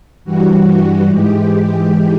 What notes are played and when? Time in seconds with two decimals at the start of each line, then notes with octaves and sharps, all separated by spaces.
0.24 G2 E3 G3 F#4
1.08 G#2 E3 G#3 G4